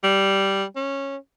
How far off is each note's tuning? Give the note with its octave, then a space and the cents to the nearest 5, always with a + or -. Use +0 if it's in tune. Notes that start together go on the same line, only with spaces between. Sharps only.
G3 -5
C#4 -10